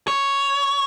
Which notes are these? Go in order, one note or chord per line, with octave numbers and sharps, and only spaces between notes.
C#5